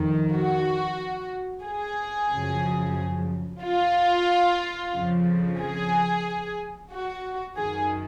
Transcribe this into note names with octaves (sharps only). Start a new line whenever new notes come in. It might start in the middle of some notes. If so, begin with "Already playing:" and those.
Already playing: F2 D#3
F#4
G#4
F#2 C#3 F3
F4
F2 C#3 F3
G#4
F#4
F#2 D#3 G#4